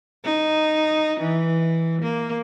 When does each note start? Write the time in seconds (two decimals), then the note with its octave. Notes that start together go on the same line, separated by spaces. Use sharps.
0.24 D#4
1.20 E3
2.02 A#3